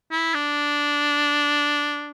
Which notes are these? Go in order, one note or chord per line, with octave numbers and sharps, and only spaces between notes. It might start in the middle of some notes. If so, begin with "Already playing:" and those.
E4
D4